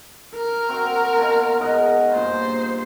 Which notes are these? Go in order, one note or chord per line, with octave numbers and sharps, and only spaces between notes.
A#4
C4 F#4
B2 C#4 F4
G#2 D#5 F#5
G2 A#2 C5